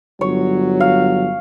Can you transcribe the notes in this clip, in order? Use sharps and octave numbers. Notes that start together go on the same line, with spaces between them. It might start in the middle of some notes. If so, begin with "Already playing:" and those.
G1 F#3 C#5
F5